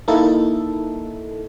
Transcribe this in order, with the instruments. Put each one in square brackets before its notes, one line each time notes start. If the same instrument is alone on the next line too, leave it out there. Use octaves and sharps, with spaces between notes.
[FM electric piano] A#3 D#4 E4 A4